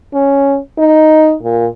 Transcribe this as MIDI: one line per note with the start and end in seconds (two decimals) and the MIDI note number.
0.13 0.58 61
0.78 1.34 63
1.43 1.67 46